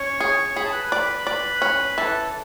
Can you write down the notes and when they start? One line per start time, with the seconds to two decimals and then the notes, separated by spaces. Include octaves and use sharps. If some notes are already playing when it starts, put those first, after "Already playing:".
Already playing: C#4 C#5 C#6
0.20 G#4
0.56 G#4 B5
0.65 A5
0.72 B4 B5
0.92 D5
1.27 D5
1.62 C#4
1.97 E3 A4 A5